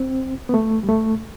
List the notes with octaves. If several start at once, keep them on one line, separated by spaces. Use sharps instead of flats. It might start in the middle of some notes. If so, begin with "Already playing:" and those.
Already playing: C4
B3
A3
G3
A3